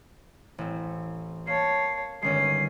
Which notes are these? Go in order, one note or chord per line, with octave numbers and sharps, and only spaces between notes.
A1 C4
A#3 C#5 A5 C7
G1 D#3 G#3 C#4 C7